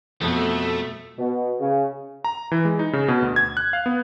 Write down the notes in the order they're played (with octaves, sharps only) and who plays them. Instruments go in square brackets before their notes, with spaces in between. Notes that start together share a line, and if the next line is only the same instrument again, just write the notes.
[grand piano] F2 B2 [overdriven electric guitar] A3
[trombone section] B2
C#3
[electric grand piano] A#5
E3
G#3
D#4
C#3
B2
D2
G#6
F#6
F5
B3